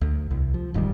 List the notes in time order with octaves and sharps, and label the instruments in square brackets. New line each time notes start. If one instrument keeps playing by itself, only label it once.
[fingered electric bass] D2
C2
F3
D#1 G#2 D#3 G3